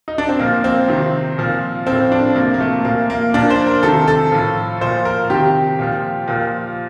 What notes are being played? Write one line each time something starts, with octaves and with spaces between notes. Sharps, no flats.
D#4
D4
C4
A#2 F3 A#3
C4
C3 D#3
A#2 F3
F3 C4
A2
D4
C3 F3 A#3
A#3
A3
A#2 F3 A#3
A#3
A#2 F3 D4
C5
A#4
C3 D#3 A4
A4
A2 F3
A#2 F3 C5
A#4
C3 D#3 G4
A#2 F3
A#2 F3